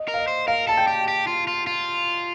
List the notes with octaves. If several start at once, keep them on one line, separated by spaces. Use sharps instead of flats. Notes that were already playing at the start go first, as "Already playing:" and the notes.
Already playing: D#5
A#4
F5
D#5
C5
A#4 F5
A4 A5
G5
G4
G4
F4
F4
F4